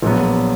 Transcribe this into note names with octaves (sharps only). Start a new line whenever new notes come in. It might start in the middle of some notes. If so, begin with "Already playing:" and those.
A#1 A#2 F#3 B3